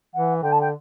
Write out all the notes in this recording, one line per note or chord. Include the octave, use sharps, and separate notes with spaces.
E3 F#5
D3 G5
A5
G5